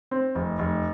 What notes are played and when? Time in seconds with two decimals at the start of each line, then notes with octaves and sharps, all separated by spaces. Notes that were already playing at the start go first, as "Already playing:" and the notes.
0.11 C4
0.35 F1
0.59 F1